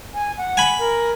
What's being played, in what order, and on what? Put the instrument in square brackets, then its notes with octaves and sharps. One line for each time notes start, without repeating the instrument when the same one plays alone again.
[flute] G#5
F#5
[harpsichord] G#5 B5
[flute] A#4